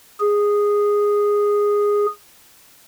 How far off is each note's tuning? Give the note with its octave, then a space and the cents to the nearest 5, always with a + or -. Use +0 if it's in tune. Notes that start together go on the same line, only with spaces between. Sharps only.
G#4 -10